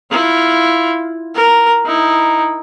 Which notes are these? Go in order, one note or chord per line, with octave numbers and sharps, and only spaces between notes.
E4 F4
A#4
D#4 E4